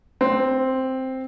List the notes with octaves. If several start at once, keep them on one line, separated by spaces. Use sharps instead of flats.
C4